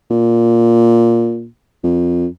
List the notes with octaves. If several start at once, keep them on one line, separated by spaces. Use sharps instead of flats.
A#2
F2